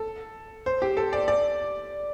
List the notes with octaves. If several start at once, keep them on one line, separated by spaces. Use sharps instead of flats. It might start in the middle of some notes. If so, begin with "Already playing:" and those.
Already playing: A4
C5
G4
A4
D5
D5